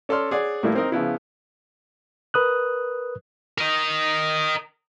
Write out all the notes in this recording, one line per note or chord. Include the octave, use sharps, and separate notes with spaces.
C#4 A4 D5 C6 F6
G#4 C#5 D5 F#5
A2 G3 A#3 E4
C4 D#4 A#4 D#5
C#3 F3 B3 E4
A#4 B4 D#6 F#6
A#4 D#5